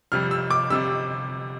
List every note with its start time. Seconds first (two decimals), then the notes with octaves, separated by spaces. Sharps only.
0.12 F2 C3 G3 F6
0.31 E6
0.50 D6
0.70 C3 G3 E6